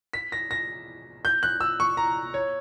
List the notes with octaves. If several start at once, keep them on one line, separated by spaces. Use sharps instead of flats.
B6
A#6
A#6
G6
F#6
E6
C#6
A#5
C#5